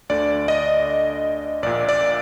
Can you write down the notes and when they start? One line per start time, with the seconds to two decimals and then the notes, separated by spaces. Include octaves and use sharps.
0.09 D2 D3 D5
0.48 D#5
1.63 A#1 D5
1.66 A#2
1.89 D5